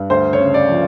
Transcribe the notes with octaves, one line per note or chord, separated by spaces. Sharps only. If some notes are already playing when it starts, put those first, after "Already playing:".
Already playing: G2
D2 C5
C#5
C#3
D5
F3